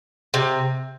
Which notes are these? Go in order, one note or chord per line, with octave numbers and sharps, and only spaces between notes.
C3